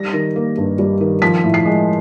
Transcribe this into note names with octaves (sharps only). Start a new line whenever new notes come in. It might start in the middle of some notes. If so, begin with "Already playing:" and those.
Already playing: G3 A#6
D#3
A#3
G2
G3
D#3
F3 B6
A2
C7
G#3